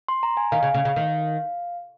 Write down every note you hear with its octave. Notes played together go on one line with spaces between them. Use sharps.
C6
A#5
G#5
D#3 F5
C#3
C#3
C#3
D#3